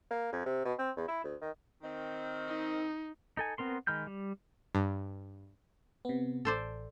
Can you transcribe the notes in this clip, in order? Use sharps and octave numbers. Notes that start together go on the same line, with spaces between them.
A#3
F2
C3
B2
C4
E2
E4
D2
D#3
D#3 C4
D#4
D#4 A4 G#5
B3 C4 A#4 C6
D#3 G#3 B5 F6 G6
G3
G2
C3 B3
A1 A4 C5 D5